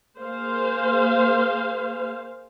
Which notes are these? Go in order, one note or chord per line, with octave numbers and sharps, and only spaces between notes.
A#3 G#4 C5 F5